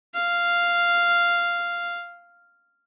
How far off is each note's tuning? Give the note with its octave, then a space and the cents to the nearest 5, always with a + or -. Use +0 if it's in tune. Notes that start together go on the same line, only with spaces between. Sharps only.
F5 -5